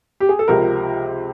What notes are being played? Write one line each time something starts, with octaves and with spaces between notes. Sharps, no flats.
G4
G#4
A4
C#2 C3 F3 A#4